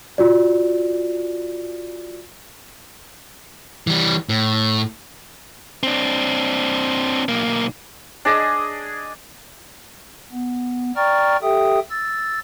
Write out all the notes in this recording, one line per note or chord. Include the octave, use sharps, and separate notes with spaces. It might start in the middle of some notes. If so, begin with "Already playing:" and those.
F4 F#4 D5
E3 G3
A2
C4 D4
B1 A#3
D4 G#4 D#5
B3
D5 G5 A#5 C#6 F6 A6
G4 A4 E5 G5 D#6
E6 A6